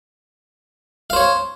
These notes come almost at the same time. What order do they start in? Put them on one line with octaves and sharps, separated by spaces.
F5 C5 C#5